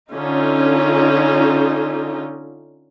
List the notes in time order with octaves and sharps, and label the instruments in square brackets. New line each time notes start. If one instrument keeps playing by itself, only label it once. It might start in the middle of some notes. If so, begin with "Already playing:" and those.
[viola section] D3 C#4 D#4 F4